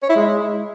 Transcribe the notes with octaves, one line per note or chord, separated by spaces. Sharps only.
C#5
E4
G#3